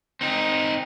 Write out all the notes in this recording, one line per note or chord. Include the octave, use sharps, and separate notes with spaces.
C4 D#4